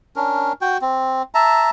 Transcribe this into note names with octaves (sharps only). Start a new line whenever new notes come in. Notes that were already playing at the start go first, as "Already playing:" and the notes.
C#4 D4 A#4
F#4 G5
C4
E5 A5 A#5